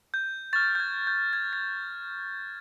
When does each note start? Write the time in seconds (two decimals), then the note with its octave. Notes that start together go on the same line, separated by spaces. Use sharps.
0.14 G6
0.53 C#6 F6 A6
0.75 G6
0.80 G#6
1.07 G6
1.33 G#6
1.53 A6